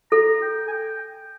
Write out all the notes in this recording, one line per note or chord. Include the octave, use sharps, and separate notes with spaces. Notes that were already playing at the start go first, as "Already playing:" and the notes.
A4 A#5
G5
G#5
G5